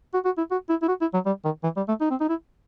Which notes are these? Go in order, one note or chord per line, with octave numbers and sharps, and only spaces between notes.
F#4
F#4
E4
F#4
E4
E4
F#4
E4
F#3
G3
D#3
E3
G3
A3
D#4
C4
D#4
E4